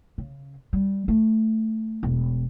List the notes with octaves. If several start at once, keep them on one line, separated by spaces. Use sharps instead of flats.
C#3
G3
A3
E1